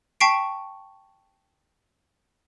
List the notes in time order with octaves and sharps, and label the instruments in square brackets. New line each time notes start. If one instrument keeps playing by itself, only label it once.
[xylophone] G5 A5 C#6 B6 C7 D7